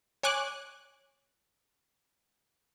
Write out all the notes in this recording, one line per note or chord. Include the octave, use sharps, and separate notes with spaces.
C#5 G#5 D6 F#6